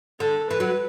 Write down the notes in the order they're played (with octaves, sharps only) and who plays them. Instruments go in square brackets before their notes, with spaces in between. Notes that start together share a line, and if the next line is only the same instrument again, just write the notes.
[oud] D3 [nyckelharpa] A4
[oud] E3 [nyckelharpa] B4
[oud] F#3